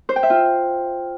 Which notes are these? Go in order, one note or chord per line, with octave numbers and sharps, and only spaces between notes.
C5
G5
E5
F4